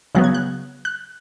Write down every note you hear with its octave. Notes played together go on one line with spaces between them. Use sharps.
C#3 F#3 B3 F#6
G#6
F#6
F#6